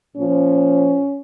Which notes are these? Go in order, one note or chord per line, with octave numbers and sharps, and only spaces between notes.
A#2 F3 C#4